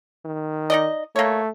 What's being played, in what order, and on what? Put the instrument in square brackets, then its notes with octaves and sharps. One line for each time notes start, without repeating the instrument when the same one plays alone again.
[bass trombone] D#3
[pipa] D#4 D5 D#5
[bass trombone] A3 [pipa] A#3 C#5